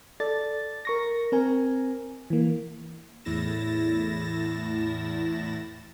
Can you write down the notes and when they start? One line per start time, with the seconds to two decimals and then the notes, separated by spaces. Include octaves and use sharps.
0.20 A4 D5 A6
0.85 A#4 C#6 A#6
1.32 C4 A#4 G#5
2.30 E3 A#3
3.25 E2 A2 E4 A6 A#6 E7